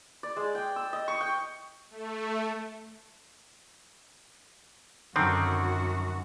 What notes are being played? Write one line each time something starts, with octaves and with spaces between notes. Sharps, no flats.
D5
G#3
G5
E6
D#5
C#6
G5
A3
F#2 D3 D#3 C4 F#4